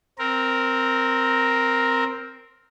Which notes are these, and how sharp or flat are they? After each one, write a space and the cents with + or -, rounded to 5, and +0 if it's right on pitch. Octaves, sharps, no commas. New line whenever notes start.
C4 +0 A#4 +0